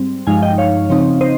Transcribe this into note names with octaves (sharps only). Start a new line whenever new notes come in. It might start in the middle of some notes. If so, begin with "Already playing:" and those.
Already playing: G#2 G3 C4
G2 F3 G#3 D#4 F5 G#5
D#5 G5
C#5 F5
C#3 F3 C4 D#4
C5 D#5